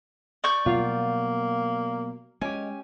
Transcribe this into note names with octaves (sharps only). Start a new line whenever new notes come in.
D5 C#6 G6
B2 F#3 G3 A#3 F4 F#4 F5
G#3 C#4 G4 G#5